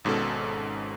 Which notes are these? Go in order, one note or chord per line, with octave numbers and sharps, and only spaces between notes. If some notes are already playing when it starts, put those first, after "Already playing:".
G#1 G#2 B2 C#4 A4